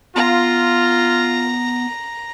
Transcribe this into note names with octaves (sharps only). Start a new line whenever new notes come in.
B3 F4 A#5